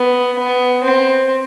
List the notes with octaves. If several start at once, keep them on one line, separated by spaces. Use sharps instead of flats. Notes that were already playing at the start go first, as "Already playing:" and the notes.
Already playing: B3
B3
C4